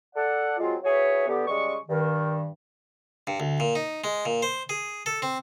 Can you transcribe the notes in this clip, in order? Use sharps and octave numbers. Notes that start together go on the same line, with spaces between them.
A4 D5 F#5
F#3 G#3 C4 F4
E4 F#4 G#4 B4 C#5
D3 B3 G4
C#3 G3 G#3 C#6
G2 D#3
G2
D2
A#2
D#4
G#3
A#2
C5
G#4
A4
C4